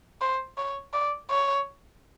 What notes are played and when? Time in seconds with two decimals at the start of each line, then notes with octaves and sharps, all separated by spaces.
0.21 C5
0.57 C#5
0.93 D5
1.30 C#5